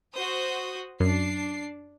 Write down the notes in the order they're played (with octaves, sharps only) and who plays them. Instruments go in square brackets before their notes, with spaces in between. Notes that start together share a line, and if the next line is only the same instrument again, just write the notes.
[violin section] F#4 C5 D#6
[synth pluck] F#2 [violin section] D4 C7